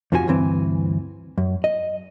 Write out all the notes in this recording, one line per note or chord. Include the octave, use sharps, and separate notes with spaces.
F2 C3 F3 F#4 A#4 G#5
D2 G2 E3 C4
F#2
D#5